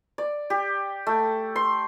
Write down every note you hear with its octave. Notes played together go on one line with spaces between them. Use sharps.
D5
G4
A3
C6